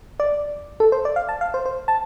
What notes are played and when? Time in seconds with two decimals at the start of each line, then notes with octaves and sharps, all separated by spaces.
0.20 D5
0.80 A4
0.92 C5
1.05 D5
1.16 F5
1.29 A5
1.41 F5
1.54 C5
1.66 C5
1.88 A5